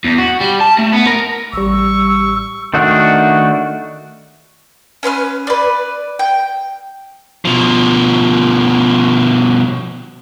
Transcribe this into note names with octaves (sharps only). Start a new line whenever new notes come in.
E2
F#4
G3
A5
A3
B3
A#4
A1 G3 C#6 E6
D#3 A3 D4 F#4
C#4 B4 B5 F6
B4 D5
G5
B2 F3